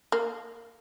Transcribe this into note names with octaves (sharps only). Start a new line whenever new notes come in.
A#3